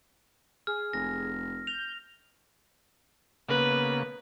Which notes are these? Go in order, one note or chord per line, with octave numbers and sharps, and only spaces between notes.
G#4 F6
F1 A#6
G6 F7
C#3 A#3 B3 B4